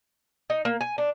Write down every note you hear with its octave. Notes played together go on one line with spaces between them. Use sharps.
D#4
A#3
G#5
D4